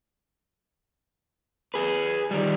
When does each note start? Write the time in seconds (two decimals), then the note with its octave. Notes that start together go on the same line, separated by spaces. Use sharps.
1.74 G#4 B4
2.31 D#3 G3